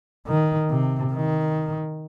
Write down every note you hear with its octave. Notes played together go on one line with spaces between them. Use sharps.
D#3
C3
D#3